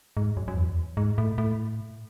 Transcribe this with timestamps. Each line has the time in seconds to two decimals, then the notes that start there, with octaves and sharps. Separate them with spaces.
0.17 G#2
0.37 F#2
0.48 F#2
0.56 E2
0.97 G#2
1.18 A2
1.38 A2